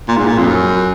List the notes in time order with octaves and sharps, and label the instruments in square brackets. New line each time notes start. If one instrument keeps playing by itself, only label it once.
[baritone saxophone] A#2
G#2
A#2
F2
F#2